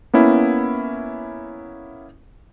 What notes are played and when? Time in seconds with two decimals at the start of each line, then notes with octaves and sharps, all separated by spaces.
0.13 A#3 B3 C#4 E4